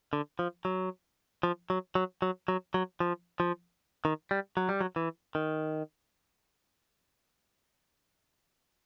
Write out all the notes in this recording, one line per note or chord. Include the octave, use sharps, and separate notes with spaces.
D3
F3
F#3
F3
F#3
F#3
F#3
F#3
F#3
F3
F3
D#3
G3
F#3
G3
F#3
E3
D#3